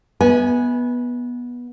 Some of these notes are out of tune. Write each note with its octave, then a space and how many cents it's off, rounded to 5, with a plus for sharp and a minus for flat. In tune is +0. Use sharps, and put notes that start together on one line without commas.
B3 -15 E5 -40 G#5 +0